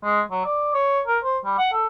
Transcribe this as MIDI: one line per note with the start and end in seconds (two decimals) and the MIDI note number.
0.04 0.21 56
0.31 0.42 54
0.45 0.72 74
0.74 1.01 73
1.07 1.19 70
1.24 1.38 72
1.44 1.55 55
1.58 1.70 78
1.73 1.87 69